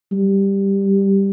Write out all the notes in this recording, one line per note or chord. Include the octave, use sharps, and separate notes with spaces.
G3